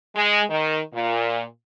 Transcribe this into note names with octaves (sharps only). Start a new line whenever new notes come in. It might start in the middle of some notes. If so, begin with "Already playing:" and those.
G#3
D#3
A#2